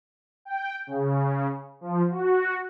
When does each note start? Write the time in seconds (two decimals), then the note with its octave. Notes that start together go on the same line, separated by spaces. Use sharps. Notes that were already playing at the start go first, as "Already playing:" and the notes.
0.45 G5
0.87 C#3
1.81 F3
2.11 F#4